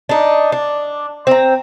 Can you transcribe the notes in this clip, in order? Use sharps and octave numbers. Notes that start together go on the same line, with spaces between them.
D4 D#4
D4
C4 A#5